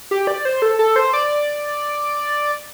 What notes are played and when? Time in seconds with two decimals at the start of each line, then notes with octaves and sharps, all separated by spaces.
0.11 G4
0.27 D5
0.45 C5
0.62 A4
0.79 A4
0.96 C5
1.13 D5